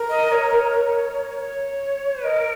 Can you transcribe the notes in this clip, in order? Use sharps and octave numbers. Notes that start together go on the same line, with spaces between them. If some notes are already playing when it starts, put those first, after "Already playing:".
Already playing: A#4
D#5
C#5
C#5
C#5
A#4 D#5